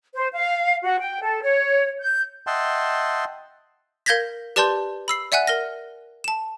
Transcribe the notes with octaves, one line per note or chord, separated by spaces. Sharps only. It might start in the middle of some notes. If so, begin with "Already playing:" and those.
C5
F5
F#4
G5
A4
C#5
G6
D#5 E5 F#5 G5 A5 C6
A#4 F5 G6 G#6 A#6 B6
G4 B4 D5 A5 C6 G6
B5 E6 C7
D5 E5 F#5 G#5 F#6
A#4 F6 A#6
A5 E7